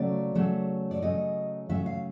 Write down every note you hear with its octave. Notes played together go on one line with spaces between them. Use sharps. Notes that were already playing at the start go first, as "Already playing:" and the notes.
Already playing: C#3 F#3 A3 C#4 D5
C#3 F#3 A3 C#4
D5
C#3 F#3 A3 C#4 D#5
C#3 F#3 A3 C#4 E5
F5